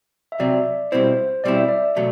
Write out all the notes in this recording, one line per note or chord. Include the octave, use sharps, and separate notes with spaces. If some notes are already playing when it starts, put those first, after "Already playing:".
E5
C3 F#3 C4 D5
B2 G3 C4 E4 C5
B2 G3 C4 E4 D5
E5
D5
B2 F#3 A3